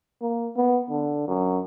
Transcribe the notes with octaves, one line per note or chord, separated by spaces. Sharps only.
A#3
B3
D3
F#2